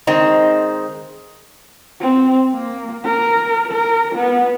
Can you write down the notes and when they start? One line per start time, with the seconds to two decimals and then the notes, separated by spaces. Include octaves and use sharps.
0.07 D#3 G#3 C4 D#4
2.00 C4
2.54 A#3
3.05 A#4
3.72 A#4
4.15 B3